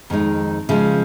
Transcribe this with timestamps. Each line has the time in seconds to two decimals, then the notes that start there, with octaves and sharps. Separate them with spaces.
0.10 F2 D#3 G#3 D#4
0.69 C#3 F3 G#3